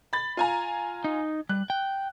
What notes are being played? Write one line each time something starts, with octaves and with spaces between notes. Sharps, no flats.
B5 A6
F4 G#5 A#5
D#4
G3 F#6
G5